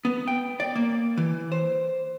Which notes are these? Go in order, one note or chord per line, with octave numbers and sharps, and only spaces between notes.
B3
G5
D5
A#3
E3
C5